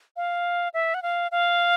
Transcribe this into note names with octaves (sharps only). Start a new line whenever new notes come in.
F5
E5
F#5
F5
F5